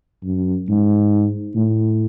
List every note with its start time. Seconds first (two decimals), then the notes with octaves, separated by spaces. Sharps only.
0.24 F#2
0.69 G#2
1.55 A2